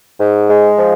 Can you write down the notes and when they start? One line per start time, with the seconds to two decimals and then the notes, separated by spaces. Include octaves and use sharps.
0.20 G#2
0.49 G#3
0.77 F3